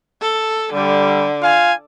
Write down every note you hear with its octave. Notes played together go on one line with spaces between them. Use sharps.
A4
D3 G3
F4 F5 G#5